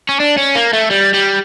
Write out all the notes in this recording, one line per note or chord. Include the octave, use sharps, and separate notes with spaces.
C#4
D4
C#4
A#3
A3
G3
G3